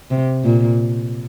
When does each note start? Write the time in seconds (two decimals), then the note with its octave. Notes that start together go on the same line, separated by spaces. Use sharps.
0.11 C3
0.45 A#2